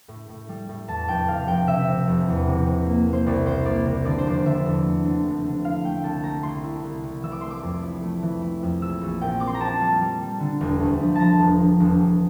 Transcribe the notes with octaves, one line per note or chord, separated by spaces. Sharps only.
A2
A2
G3
A2
E2 A5
F1 G5
C3 F5
F1 G5
C3 E5
C3
F1
E2
C3
C3
A#3
A#3
C5
C2 D5
C3 C5
A#3 D5
C3
D3 D5
C5
F1 D5
D3 E5
E2
A3
D3
F1
D3
E4 F5
A3 G5
C2 A5
A3 A#5
C2 C6
E4
C2
C2
E3 E6
D6
A3 C6
D6
F2
E4
A3
E3
E4
F2
A#1 E6
A#1
A#2 G5
C4 D6
C6
A#5
C4 A5
G3
G3
G3
D3
E1
D2
F3
F3 A5 A#5
E1
F3
E1
E1